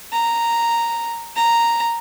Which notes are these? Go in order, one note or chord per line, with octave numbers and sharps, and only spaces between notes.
A#5
A#5